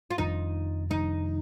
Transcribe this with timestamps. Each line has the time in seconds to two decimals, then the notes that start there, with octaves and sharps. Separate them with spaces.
0.11 F4
0.18 F1 F2 D#3 G3 D#4
0.90 F1 F2 D#3 G3 D#4